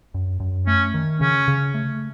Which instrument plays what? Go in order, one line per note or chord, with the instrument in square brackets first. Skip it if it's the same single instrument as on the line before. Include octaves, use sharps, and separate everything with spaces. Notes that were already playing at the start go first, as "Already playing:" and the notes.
[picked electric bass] F#2
F#2
[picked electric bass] A3 [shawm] C#4
[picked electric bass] D#3
[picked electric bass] C#3 [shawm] C#4
[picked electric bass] C#3
A3